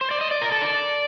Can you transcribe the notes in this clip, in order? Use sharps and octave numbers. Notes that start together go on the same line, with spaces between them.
C5
D5
D#5
D5
A#4
A4
D5